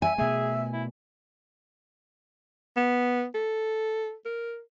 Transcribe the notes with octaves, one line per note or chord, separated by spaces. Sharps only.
E5 G#5
B2 A3 G#4 E5
E4
B3
A4
A#4